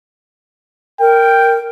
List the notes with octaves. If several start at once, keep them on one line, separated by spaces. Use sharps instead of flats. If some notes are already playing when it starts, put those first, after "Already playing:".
A#4 G5